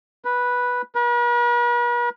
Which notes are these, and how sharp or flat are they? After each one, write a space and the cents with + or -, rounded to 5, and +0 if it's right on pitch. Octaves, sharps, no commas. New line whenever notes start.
B4 -10
B4 -45